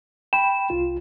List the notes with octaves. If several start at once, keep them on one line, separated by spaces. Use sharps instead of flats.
G5 B5 E7
C2 F4